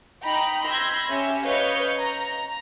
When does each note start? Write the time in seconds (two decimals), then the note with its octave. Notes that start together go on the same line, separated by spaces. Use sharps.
0.23 D#4 G5 A#5 B5
0.68 B5 C6 E6 G6 G#6 A#6
1.09 C#4 G4 E5
1.45 B4 C#5 D#5 F5 G6
1.99 A#5